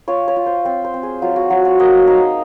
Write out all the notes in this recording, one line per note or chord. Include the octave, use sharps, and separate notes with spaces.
F4 C#5
C#5
F4
C5
C4 C5
C5
C4
G#4
F#3 F4
F#4
F#3 F4
F#4
A#3 D#5
D#4 F5